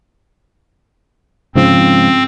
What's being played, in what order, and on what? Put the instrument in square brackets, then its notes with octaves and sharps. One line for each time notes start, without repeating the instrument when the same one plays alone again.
[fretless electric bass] G#2 C#3 F3 [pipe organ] C4